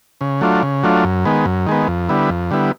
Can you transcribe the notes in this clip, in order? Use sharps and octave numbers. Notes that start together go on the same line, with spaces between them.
C#3
F#3 A3 D4 F4
C#3
F#3 A3 D4 F4
F#2
D#3 G#3 B3
F#2
D#3 G#3 B3
F2
D3 G3 B3 E4
F2
D3 G3 B3 E4